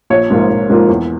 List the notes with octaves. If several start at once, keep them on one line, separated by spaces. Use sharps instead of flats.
A#1 C#5
G#2 F3 A#3 F4
A#1
G#2 F3 A#3 F4
E2